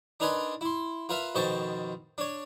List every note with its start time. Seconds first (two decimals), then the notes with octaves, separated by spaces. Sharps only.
0.20 D4 D#4 A#4 B4 G#5 C6
0.61 E4 C6
1.09 F4 A#4 B4 E5 F5
1.35 F2 B2 D#3 C5 A5 C#6
2.18 D4 C#5